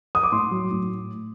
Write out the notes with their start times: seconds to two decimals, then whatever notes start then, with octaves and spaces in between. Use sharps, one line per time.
0.15 D#6
0.23 D6
0.32 A2 C6
0.51 F#3
0.71 A2